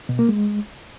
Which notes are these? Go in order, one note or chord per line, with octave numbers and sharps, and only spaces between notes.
B2
A#3
G#3